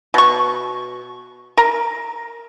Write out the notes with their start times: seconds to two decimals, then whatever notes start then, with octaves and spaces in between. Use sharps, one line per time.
0.14 B2 C#6
1.57 A#4